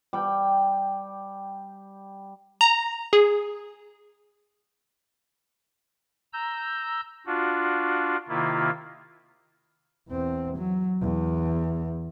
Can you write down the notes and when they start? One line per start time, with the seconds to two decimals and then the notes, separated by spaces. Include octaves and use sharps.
0.13 G3 G5 A5
2.61 A#5
3.13 G#4
6.33 A#5 E6 G6
7.26 D4 F4 F#4
8.28 C3 D#3 A#3 E4 F4
10.08 E2 C4
10.57 F#3
11.01 E2